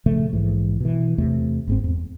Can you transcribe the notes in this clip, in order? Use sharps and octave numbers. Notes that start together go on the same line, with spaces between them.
A#2 C#3 F3 A3
A#1 G#2 E3
B2 E3
E2 C3 A3
G1 G#2 C4
E2